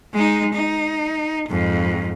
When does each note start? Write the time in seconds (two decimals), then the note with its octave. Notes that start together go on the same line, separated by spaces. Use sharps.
0.13 G#3 D#4
0.53 D#4
1.48 F2 G#2